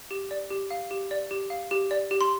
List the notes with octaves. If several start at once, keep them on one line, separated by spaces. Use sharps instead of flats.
G4
D5
G4
F5
G4
D5
G4
F5
G4
D5
G4
C6